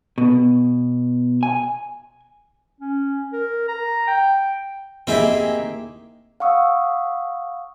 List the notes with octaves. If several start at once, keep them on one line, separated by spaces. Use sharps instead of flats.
B2
G#5
C#4
A#4
A#5
G5
A#3 C4 D#4 E4 G4 G#4
F5 F#5 C#6 D#6 E6